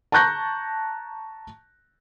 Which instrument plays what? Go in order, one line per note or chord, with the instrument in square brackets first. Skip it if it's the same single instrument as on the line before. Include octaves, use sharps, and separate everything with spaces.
[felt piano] A5 A#5 C#6 F#6 G6 A#6